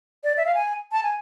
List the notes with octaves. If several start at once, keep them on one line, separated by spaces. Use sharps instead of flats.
D5
E5
F5
G#5
A5
G#5